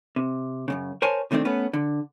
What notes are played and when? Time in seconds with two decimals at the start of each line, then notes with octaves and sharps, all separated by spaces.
0.16 C3
0.68 F#2 A2 C#3
1.02 A#4 C5 C#5 G#5 A5
1.31 C3 D#3 A3 C4 D4
1.45 A3 B3 C#4 B4
1.73 D3